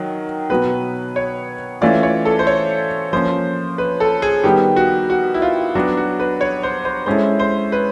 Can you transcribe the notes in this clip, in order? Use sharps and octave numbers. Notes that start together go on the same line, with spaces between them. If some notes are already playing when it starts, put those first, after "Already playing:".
Already playing: D#3 F#3
B2 F#3 B3 B4
C#5
E3 A3 C#4 F4 D5
C#5
A4
C5
C#5
F3 A#3 C#4 C5
B4
A4
G#4
D#3 G3 B3 G4
F#4
F#4
E4
F4
F#3 B3 D4 F#4
F#4
B4
C#5
C5
C5
G#3 C#4 E4 A4 C5
C5
B4